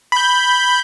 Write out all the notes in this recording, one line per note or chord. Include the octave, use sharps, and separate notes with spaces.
B5 G6